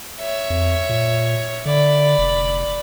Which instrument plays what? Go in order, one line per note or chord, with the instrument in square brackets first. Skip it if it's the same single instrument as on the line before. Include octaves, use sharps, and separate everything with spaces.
[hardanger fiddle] C#5 E5
[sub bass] F2
A#2
[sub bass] D3 [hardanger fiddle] D5 B5
[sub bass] F1